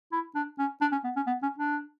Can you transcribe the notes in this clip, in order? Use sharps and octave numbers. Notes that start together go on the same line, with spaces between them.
E4
D4
C#4
D4
C#4
B3
C#4
B3
C#4
D4